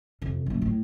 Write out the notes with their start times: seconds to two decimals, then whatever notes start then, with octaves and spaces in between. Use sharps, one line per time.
0.22 F2 C3
0.46 F#2 A#2
0.62 A2